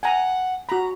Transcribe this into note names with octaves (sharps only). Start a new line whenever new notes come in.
F#5 G#5 A#5
F#4 A#5 B5